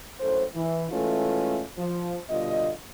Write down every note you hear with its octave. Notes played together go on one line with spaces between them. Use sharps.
F#2 A2 A4 C5
E3
E3 G#3 A3 C#4 F4 A4
F3
B2 D3 G3 F4 D#5